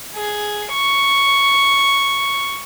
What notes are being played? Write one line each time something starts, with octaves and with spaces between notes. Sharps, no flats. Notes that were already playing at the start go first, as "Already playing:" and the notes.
G#4
C#6